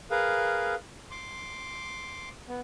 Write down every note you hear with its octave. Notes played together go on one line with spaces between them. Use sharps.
G#4 A#4 B4 F5
C6 D6
B3